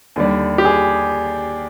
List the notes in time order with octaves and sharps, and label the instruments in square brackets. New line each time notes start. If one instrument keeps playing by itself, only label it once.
[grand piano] D#2 D3 G3
G4
G#4